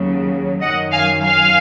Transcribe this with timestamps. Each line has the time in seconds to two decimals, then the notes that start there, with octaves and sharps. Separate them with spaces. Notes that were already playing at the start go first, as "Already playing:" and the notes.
Already playing: D#2 C#3 F#3
0.61 F#2 D#3 F#3 D#5 F#5
0.92 F5 G#5
1.23 F5 G#5